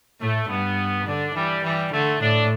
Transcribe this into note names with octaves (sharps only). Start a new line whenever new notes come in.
A2 A3
G2 B3
D3 D4
E3 G3
E3 G3
D3 A3
A2 D4